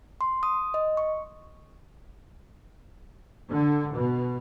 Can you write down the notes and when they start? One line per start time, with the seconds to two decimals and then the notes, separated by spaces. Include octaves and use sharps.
0.21 C6
0.43 D#6
0.74 D#5
0.97 C#6
3.49 D3
3.94 B2